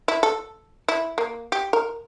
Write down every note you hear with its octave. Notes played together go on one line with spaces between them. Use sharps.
E4
A4
E4
A#3
G4
A#4